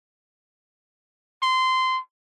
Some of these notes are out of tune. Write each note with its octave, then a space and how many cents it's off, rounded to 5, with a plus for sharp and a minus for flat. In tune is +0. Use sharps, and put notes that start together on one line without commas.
C6 -15